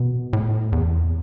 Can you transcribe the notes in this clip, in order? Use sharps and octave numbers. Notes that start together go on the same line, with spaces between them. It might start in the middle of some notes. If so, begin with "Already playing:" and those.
Already playing: B2
A2
E2